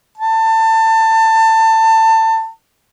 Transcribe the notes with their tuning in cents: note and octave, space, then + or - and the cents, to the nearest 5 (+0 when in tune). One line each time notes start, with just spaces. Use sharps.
A5 +25